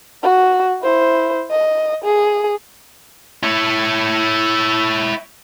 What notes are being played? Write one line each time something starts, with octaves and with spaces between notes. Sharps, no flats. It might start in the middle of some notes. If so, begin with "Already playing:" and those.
F#4
E4 C5
D#5
G#4
E4 C#5